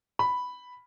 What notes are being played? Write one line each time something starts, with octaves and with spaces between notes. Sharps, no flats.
B5